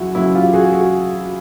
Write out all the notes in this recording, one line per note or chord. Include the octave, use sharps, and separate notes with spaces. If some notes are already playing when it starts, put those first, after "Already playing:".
Already playing: F#2 C#3 E3 E4 F#4
F#2 C#3 E3 E4 F#4
F4 G4
F#4 G#4
F#4 G#4